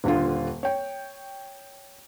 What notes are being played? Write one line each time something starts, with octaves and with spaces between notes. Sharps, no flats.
D#1 D3 F4
C#5 G5